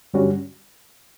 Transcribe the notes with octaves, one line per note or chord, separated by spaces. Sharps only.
G2 D3 G3 C#4 F#4